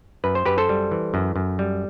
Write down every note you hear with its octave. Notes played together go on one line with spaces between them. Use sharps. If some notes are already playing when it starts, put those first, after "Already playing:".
F#2 B4
C5
F#2 G4 B4
A4 C5
G3
E3
F#2
F#2
G3